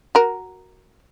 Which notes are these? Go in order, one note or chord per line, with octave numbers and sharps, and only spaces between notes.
F#4 A#4